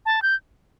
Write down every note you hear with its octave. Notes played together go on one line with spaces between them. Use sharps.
A5
G6